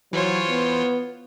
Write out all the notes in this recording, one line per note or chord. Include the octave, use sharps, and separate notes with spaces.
E3 F#3 F4 C5 C#5
B3